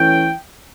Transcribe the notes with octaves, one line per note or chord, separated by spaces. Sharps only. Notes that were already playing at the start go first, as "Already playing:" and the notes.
Already playing: E3 A3 C#4 G5